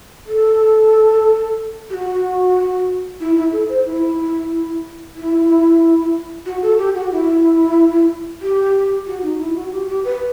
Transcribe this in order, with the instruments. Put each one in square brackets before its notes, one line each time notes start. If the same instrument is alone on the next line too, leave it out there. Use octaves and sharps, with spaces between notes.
[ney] A4
G4
F#4
E4
E4
A4
C5
E4
E4
F#4
A4
G4
F#4
E4
G4
F#4
D#4
E4
F#4
G4
G4
B4